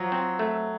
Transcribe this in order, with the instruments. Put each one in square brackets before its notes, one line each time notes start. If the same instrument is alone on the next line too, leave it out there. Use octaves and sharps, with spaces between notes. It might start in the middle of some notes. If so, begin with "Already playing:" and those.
Already playing: [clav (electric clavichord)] F3 [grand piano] F#3
[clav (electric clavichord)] C4
A3